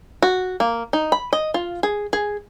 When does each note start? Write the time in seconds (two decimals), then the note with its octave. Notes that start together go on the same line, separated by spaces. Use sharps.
0.23 F#4
0.60 A#3
0.93 D#4
1.12 B5
1.33 D#5
1.54 F4
1.83 G#4
2.13 G#4